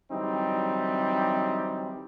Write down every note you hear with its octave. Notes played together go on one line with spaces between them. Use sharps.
D3 E3 F#3 G3 C4 D#4